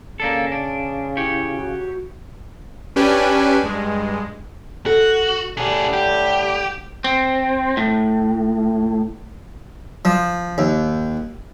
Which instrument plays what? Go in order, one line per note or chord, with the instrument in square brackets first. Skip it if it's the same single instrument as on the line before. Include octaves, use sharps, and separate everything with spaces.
[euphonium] C#3 [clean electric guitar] A#3 D4 A4
[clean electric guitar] D4
[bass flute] E4 [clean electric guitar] G4 C#5
[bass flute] F#4
[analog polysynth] C#4 D4 G4 B4 G#5
G2 G#3
[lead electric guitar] F#4 [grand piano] A4
[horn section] A2 D3 G3 [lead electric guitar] D4 G#4
[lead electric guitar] G4
C4
A2
[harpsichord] F3
D#2